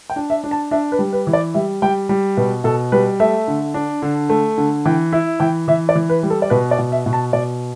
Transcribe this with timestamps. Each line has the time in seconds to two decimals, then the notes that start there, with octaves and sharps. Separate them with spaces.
0.10 G5
0.16 D4
0.30 E5
0.44 D4
0.51 A5
0.71 D4 E5
0.92 B4
0.99 G3
1.13 B4
1.27 E3
1.33 D5
1.54 G3 E5
1.82 G3 G5
2.09 G3
2.37 B2 B4
2.64 B2 A4
2.92 G3 B4
3.20 A3 E5
3.48 D3
3.74 D4
4.02 D3
4.29 A3
4.58 D3
4.85 E3 G5
5.13 E4 E5
5.40 E3 G5
5.68 E3 E5
5.89 D5
5.95 E3
6.09 B4
6.23 G3
6.30 A4
6.42 D5
6.50 B2 B4
6.71 D5
6.79 B2
6.92 E5
7.06 B2
7.13 A5
7.33 B2 D5